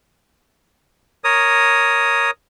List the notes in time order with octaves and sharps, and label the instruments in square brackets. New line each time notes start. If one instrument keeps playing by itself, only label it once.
[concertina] A#4 C#5 D#6